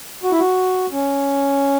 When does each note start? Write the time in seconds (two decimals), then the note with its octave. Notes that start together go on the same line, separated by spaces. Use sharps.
0.24 F#4
0.32 E4
0.40 F#4
0.92 C#4